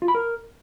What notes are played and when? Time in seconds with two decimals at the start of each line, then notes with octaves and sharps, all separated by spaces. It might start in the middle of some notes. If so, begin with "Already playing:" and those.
0.02 F4
0.08 B5
0.15 A#4